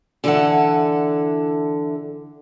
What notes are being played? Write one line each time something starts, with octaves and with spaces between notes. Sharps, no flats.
D3 E3 E4 A4 F#5